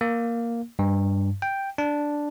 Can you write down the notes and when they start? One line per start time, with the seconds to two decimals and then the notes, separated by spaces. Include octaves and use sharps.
0.01 A#3
0.79 G2
1.42 G5
1.78 D4